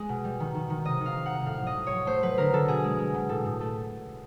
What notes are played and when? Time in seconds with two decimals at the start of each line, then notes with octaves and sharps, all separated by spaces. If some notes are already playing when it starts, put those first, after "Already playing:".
Already playing: G#3
0.09 B2
0.24 G3
0.40 D#3
0.55 D#3
0.70 D#3
0.85 C3 D#5
1.01 D#3
1.06 F5
1.16 D#3
1.26 F#5
1.31 C3
1.46 A2 F5
1.61 F#3
1.67 D#5
1.77 A2
1.87 C#5
1.92 F#3
2.06 A3 C5
2.23 F#3 B4
2.38 D3 A#4
2.53 D3 A4
2.68 B2 G#4
2.84 G#3
2.98 G#3
3.14 B2
3.29 A2 A4
3.45 A2
3.60 A3 A4